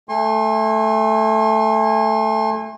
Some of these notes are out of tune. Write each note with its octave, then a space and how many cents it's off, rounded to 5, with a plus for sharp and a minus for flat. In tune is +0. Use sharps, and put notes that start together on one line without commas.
A3 +0 G#5 -35 C6 +40